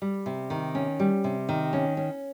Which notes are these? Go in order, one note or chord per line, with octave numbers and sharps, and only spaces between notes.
G3
C3
D#3
C#4
G3
C3
D#3
C#4
C#4